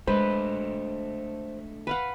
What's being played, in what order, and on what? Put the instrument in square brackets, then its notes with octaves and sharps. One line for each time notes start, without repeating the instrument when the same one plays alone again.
[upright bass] G#3 [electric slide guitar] A3 D4 D#5 [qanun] B4 [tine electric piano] C5
[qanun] B4 F5 F#5